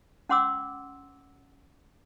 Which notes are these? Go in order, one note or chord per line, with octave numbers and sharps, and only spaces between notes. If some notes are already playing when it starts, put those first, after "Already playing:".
C#4 F#5 C6 D6 E6